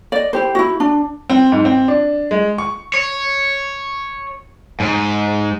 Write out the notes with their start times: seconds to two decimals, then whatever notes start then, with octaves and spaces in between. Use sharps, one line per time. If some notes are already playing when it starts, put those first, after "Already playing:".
0.12 D5 D#5
0.33 E4 G4 C5
0.55 E4 F#4
0.80 D4
1.30 C4
1.52 G#2
1.65 C4
1.88 D4
2.31 G#3
2.58 C#6
2.94 C#5
4.80 G#2